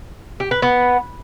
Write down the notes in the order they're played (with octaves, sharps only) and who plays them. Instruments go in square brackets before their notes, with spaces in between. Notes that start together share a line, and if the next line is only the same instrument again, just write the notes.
[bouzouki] G4
B4
B3